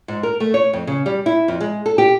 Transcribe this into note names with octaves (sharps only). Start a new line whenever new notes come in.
G#2
A#4
A3
C#5
F2
C#3
G3
E4
F2
G#3
A4
G4